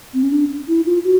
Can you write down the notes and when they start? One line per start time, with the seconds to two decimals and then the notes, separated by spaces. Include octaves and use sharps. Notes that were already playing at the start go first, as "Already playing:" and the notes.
0.14 C4
0.23 C#4
0.32 D4
0.68 E4
0.86 F4
1.04 F#4